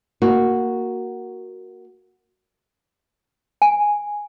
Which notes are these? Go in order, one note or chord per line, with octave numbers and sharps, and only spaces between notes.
A#3 F#4
G#5